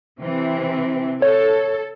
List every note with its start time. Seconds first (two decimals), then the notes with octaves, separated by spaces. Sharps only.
0.22 C3 E3 C4
1.22 A4 C#5